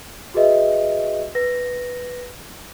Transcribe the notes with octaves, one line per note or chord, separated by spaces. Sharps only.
F#4 G#4 B4 D#5 E5
B4 A#6